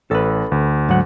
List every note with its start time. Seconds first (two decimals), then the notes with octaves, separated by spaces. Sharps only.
0.11 A1 A4 B4
0.52 D2
0.89 G#2 F#3 F#5